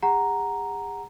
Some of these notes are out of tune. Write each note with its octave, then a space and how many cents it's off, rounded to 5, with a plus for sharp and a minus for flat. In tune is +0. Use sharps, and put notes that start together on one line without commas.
G#4 -40 F#5 +0 A#5 +0